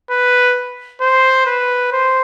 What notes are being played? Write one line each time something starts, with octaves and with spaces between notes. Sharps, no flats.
B4
C5
B4
C5